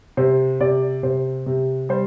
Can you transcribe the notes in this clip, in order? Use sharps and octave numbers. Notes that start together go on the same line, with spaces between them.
C3 C5
C3 D5
C3 C5
C3
G3 C5